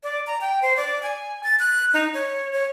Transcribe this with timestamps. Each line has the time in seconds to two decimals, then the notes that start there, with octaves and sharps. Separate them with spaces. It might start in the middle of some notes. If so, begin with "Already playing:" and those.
0.03 D5
0.27 A#5
0.41 G5
0.62 C5
0.77 D5
1.03 G#5
1.43 A6
1.60 F#6
1.94 D#4
2.14 C#5
2.53 C#5